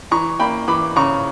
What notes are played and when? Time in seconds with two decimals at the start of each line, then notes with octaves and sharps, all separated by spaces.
0.11 E3 A#5 C#6
0.40 A#3 G5 B5
0.68 E3 B5 D6
0.96 C#3 A#5 C#6